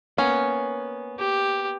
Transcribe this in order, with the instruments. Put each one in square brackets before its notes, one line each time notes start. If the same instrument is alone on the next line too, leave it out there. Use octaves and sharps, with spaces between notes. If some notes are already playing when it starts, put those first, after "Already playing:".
[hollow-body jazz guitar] A#3 B3 [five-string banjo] C#4 [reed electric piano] C#5 F#5 G#5
[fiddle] G4